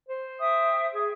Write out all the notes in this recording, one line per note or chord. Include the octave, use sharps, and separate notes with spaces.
C5
E5 G5 D#6
G#4